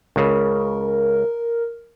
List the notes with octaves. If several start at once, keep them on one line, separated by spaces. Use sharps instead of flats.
C#2 C#3 A#4